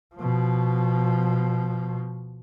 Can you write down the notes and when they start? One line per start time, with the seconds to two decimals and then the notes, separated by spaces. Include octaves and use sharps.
0.15 B2 F3